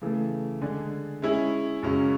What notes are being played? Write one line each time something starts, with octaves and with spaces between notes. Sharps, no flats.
C#3 E3 A3
D3 G#3 D4 G#4
G#3 C#4 E4 G#4
F#2 C#3 G#3 C#4